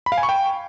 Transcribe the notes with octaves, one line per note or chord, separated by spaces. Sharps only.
B5
F5
G#5
C#6
G5